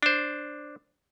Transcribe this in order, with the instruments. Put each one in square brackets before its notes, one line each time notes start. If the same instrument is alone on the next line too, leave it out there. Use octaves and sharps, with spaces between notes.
[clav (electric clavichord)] D4 C5